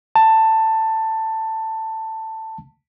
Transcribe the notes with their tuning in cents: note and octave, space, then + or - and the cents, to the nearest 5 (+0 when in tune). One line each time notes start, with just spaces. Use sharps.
A5 +10